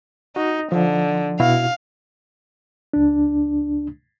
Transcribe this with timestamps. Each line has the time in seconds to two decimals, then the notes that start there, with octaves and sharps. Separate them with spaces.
0.36 D#4 F#4
0.72 D3 F3
1.40 B2 E4 F#4 F5
2.93 C#2 D4